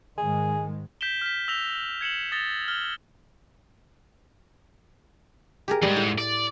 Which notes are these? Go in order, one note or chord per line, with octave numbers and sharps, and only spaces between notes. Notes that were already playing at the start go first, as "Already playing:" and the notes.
G#2 D#3 G#3 G#4
G6 B6 D7 E7 G7
F6 B6
E6 A#6 F7 G7
G#6 C#7 E7 F#7
D#6 A6 A#6 G7
F6 G7
G4 G#4 A#4
F2 G#2 G3
A2
D5